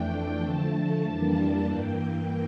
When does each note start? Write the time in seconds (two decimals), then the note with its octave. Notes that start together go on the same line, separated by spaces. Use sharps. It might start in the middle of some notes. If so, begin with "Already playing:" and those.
Already playing: F2 E3 A3 D4 G5
0.10 G5
0.42 D3 F3 A3 A5
1.05 F2 E3 G3 A#3 D4 A5
1.37 A5
1.69 G2 E3 A#3 G5